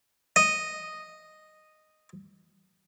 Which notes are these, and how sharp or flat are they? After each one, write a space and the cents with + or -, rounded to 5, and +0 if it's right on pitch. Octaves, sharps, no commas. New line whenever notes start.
D#5 -5